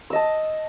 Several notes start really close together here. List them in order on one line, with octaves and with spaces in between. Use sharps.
E6 D#5 A5